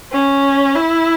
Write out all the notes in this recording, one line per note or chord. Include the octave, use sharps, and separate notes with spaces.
C#4
E4